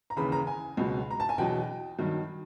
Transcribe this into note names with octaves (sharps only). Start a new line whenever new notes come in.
A#5
D#2 C#3 E3 B5
A#5
G#5
C#2 B2 F#3
A#5
A5
G#5
E2 B2 F#3 G5
G2 D#3 F#3